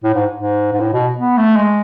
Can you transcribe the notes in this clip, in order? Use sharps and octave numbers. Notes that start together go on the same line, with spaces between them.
A2
G#2
G#2
G#2
A2
B2
B3
A3
G#3